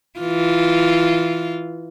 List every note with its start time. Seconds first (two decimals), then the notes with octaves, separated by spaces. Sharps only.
0.19 E3 F4